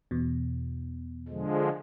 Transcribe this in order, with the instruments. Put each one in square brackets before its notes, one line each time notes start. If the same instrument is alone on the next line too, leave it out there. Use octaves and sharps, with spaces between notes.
[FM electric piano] E2 B2
[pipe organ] D3 F3 G#3